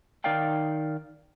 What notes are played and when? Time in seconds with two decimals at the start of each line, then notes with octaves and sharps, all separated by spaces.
0.24 D#3 D#4 A#4 D5 F5 G5